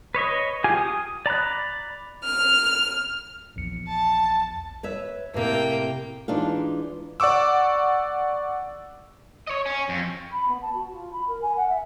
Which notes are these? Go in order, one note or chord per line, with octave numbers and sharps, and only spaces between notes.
B4 C#5 D#5 C#6
F4 G4 G#4 G#5
D#6
D5 A#5 B5 F#6
F6
A#1 E2 C#7
A5
B4 C#5 E5
A2 C3 A#3 G5
E3 G#3 D4 D#4 F4
D5 F#5 C#6 D6 E6
C#5 D#5
C#4
F2
B5
B3
A5
F#4
F4
B5
A#4
G#5
F#5
E5